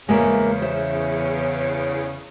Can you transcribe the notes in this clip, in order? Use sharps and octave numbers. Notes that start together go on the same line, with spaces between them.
E2 C#3 G#3 A#3 E5
C5 E5